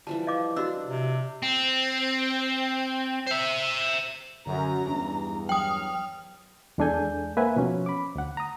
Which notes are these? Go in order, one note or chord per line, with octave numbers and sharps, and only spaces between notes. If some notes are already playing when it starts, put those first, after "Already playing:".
E3 F3 G3 A5
D#5 F5 D6
D4 F#4 D#5 E6
C3
C4
C5 E5
F#2 D3 A#5
E2 G2 D4
F#3 G5 D#6 F6
E2 G#3 D4 A4 G#5 G6
A#3 B4 C5 E5 F#5 G#5
B2 F3 C#4
B5 D6
D2 F#5
A#5 D#6